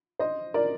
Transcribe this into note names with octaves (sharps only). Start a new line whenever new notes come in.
C5 D#5
A#4 D5